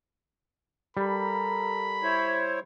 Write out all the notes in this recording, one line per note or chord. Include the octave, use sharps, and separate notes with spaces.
G3 A4 A#4 A#5 B5
E4 C5 C#5